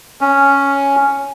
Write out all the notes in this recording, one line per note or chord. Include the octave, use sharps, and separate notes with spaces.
C#4